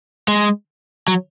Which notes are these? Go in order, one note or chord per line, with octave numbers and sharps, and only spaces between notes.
G#3
F#3